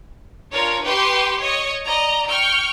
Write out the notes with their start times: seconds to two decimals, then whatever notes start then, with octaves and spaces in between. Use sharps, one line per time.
0.53 D4 F4 A#4 C#5
0.84 G4 B4 G5 C6 C#6
1.41 C#5 D#5 C#6
1.85 D5 D#5 A#5
2.29 G5 C#6 F6